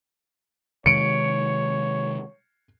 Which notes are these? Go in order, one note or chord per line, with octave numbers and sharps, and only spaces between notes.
C3 D#3 G#3 C#5 C#7 D7